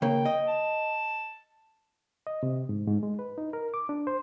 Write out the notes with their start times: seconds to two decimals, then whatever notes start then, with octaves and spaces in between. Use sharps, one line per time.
0.02 C#3 A#3 G5
0.25 D#5
0.48 A5
2.27 D#5
2.43 C3
2.69 G#2
2.87 G#2
3.03 G#3
3.19 B4
3.38 D#4
3.53 A#4
3.74 D6
3.89 D4
4.07 C5